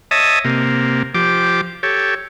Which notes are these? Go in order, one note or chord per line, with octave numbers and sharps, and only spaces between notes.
C#5 D#5 E5 A5 D#6
C3 A#3
F3 G4 D6
G4 A4 C#5